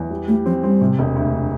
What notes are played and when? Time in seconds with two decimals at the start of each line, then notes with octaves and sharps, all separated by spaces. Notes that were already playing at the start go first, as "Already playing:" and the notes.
Already playing: E2
0.11 G3
0.28 G3 A3
0.46 F3 C4
0.63 G3 C4
0.81 C3
0.99 E1
1.16 D2